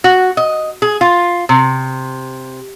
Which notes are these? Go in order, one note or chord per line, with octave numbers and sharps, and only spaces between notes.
F#4
D#5
G#4
F4
C3